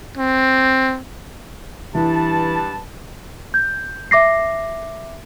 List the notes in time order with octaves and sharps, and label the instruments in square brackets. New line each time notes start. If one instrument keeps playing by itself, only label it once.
[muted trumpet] C4
[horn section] G2 B4 A5 [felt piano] E3
[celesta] G6
E5 D6 A#6 C7